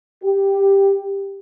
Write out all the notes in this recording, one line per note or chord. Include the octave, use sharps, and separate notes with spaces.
G4